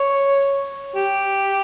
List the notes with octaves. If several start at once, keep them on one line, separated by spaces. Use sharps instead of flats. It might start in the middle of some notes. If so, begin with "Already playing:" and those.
Already playing: C#5
G4